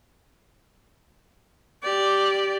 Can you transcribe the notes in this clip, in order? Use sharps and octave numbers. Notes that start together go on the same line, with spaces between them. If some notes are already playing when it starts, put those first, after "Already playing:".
G4 D5